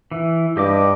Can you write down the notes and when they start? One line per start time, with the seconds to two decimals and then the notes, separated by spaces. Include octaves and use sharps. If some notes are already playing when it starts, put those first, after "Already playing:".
0.12 E3
0.57 G2 G4 D#5 D6